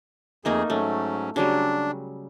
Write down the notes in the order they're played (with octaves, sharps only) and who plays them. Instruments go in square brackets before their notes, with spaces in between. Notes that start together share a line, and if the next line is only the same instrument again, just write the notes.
[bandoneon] F2 G#4 [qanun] A3 A#3 D#4
[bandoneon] G#2 F#3 C#4 [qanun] A3
[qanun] C#3 F#3 G3 [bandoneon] D4